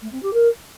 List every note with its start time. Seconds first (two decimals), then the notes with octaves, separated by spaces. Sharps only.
0.01 A3
0.11 C4
0.22 G4
0.33 A#4